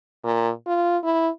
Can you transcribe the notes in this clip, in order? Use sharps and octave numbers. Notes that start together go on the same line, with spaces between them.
A#2
F4
E4